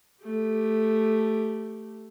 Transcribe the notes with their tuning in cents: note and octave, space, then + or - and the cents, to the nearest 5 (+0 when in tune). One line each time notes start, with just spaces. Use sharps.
A3 +0 G4 +0